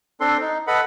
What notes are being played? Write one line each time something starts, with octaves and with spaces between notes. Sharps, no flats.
C4 D4 A4 C6
D#4
A4 B4 D#5 F#5 B5